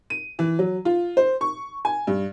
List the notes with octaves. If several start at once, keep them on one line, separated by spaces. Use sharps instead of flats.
D#7
E3
F#3
F4
C5
C#6
G#5
G2